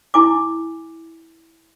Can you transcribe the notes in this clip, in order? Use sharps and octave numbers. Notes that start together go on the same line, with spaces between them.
E4 G#5 D6